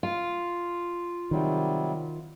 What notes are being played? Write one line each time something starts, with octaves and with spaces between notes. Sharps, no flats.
F4
C3 D#3 F#3 G3